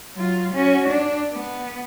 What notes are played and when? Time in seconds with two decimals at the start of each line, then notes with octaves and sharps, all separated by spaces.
0.15 F#3 F4
0.53 C#4 F#4
0.88 D4
1.32 B3